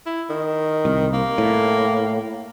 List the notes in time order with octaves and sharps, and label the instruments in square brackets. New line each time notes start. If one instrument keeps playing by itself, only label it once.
[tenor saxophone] E4
D#3
[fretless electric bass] C2
[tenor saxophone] A#3
[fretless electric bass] A2